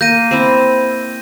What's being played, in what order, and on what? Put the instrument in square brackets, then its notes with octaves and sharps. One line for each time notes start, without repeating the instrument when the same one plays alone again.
[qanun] A#3 [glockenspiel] G6 A#6 D#7
[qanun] C4 E4